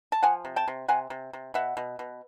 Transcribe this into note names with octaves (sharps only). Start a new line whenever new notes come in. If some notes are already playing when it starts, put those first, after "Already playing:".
A5
F3 F#5 G#5
C3
G5 A5
C3
C3 F#5 G#5
C3
C3
B2 E5 F#5
B2
B2